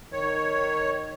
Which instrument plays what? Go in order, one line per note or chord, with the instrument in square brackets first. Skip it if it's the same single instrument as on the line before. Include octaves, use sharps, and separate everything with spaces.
[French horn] D#3 [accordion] C#5